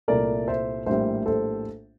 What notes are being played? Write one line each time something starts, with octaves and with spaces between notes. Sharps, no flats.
C2 A#2 A3 A#4 D5
C5 E5
A#1 A2 G3 A#3 C5 E5
A4 C5